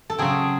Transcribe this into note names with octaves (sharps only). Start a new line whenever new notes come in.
A4
C#3 F#3 C4 G#4